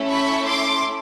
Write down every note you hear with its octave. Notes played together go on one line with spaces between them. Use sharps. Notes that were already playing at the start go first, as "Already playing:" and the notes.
Already playing: A3 C#4 E4 A4
B5 C#6
C6 D6